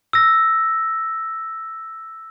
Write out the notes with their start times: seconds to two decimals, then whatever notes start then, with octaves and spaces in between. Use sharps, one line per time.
0.13 E6 A#6